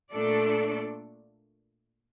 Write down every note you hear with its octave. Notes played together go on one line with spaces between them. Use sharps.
A#2 A3 D4 A4 D5